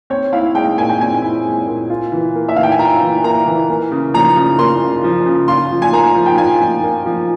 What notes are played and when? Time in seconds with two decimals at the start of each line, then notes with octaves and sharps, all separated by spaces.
0.10 C4 C#5
0.33 E4 F5
0.55 G#3 G5
0.78 A#2 G#5
0.89 G5
1.01 C4 G#5
1.22 E4
1.46 G#3
1.67 A#2
1.90 F4
2.12 E3
2.35 A#3
2.49 E5
2.56 E3 F5
2.63 G5
2.72 G#5
2.79 F4 A#5
3.01 E3
3.24 A#3 A#5
3.46 E3
3.70 A#3
3.91 C#3
4.14 F3 A#5
4.36 C#3
4.58 A#3 C6
4.80 C#3
5.04 F3
5.25 C#3
5.48 F4 C6
5.71 F3
5.82 G#5
5.93 A#3 A#5
6.15 F3
6.26 G5
6.38 F4 G#5
6.60 F3
6.83 A#3
7.06 F3